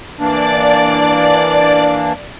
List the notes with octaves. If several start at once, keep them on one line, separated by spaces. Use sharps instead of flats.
E3 A#3 D4 D5